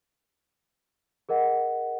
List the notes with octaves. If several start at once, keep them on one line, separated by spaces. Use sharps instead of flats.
G#4 A#4 D#5 F#5